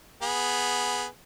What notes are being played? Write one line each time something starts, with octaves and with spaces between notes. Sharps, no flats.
B3 G#4